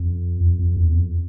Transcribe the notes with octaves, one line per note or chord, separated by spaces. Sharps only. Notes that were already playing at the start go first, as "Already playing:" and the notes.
Already playing: F2
F2
F2
E2
F2